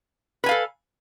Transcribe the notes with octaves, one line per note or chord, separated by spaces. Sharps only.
A4 B4 F5 G#5